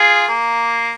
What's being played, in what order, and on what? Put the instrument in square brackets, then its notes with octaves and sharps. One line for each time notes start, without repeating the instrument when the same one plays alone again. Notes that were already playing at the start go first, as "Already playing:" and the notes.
Already playing: [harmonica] F4 G#4
A#3